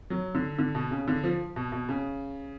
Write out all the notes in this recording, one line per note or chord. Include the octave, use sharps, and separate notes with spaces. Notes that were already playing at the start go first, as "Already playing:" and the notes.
F#3
D3
D3
B2
C#3
D3
F3
B2
B2
C#3